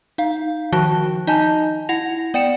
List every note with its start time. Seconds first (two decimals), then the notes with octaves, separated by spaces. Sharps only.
0.18 D#4 F5
0.73 D#3 F3 F#4 A5 F#6 G7
1.27 D#4 D#5 G#5 A5 G6
1.89 E4 F#5 A#6 F7
2.34 B3 D5 F#5 G5 C#7 E7